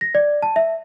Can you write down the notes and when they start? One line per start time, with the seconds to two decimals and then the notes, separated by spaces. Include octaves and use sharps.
0.01 A#6
0.15 D5
0.43 A5
0.56 E5